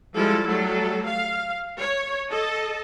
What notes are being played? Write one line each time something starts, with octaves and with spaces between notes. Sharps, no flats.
F3 G3 G#3 E4 A4
F#3 G3 A3 A4
F5
C#5
A4 D#5 A5